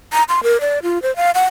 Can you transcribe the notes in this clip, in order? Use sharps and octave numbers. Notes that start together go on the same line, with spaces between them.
A#5
C6
A#4
D5
F4
C5
F5
F#5